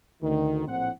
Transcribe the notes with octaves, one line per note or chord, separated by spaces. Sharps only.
D2 D#3
A#1 A2 C4 F#5